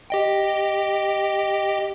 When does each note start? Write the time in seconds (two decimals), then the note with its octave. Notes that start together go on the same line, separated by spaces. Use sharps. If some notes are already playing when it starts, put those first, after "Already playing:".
0.10 G4 D#5 G5